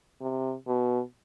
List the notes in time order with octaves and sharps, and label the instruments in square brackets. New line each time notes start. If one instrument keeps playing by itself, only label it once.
[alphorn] C3
B2